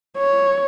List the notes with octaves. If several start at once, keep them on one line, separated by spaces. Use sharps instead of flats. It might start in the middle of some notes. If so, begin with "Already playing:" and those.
C#5